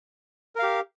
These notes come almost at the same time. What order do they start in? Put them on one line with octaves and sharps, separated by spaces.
A#4 F5 G4